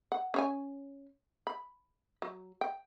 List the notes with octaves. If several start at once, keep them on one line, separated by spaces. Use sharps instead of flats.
F#5
C#4 C#5 G#5
B5
F#3
G5